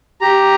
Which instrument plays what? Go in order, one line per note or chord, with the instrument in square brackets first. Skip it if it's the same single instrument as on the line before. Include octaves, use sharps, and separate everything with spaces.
[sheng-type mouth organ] G4 A#5